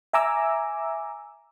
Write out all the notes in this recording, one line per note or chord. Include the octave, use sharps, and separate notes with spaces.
E5 G#5 A#5 D6 E6